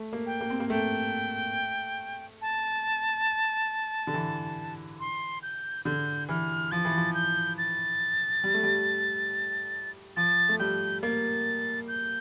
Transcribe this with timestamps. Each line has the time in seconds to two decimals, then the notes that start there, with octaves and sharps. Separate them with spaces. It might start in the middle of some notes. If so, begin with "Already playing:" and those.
Already playing: A3
0.13 A#3
0.26 G5
0.41 A#3
0.50 C4
0.60 A#3
0.70 A3 G5
2.42 A5
4.07 D3
4.14 E3
5.00 C6
5.43 G6
5.85 D3 G6
6.29 E3 F6
6.72 F3 A6
6.85 E3
6.97 F3
7.14 G6
7.58 A6
8.44 G3
8.54 A3
8.63 G3
10.17 F3 A6
10.49 A3
10.59 G3 G6
11.03 A#3 A6
11.88 G6